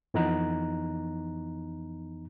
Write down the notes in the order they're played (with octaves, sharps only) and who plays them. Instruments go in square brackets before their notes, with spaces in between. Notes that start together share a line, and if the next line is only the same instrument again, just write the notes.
[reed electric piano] F2 E3 B3 D#4 A#5 F#6